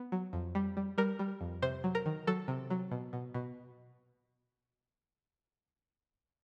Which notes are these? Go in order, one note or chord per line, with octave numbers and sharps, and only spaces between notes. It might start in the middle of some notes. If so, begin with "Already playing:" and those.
Already playing: B3
F#3
F2
G3
G3
G3 A#4
G3
F2
C3 C5
F#3
A#4
D#3
F#3 A4
C3
F#3
B2
B2
B2